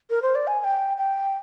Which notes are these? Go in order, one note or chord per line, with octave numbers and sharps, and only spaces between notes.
A#4
C5
D5
G#5
G#5
G5
G5